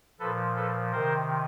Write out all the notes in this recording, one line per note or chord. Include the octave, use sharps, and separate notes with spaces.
A#2 F3 A4 B4
A4 B4
C3 D#3 A#4 C5